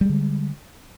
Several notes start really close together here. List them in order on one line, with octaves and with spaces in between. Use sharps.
G3 G#3 D3